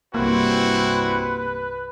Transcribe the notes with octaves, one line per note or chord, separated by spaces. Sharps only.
C2 G2 A#3 C4 E4 F#4 B4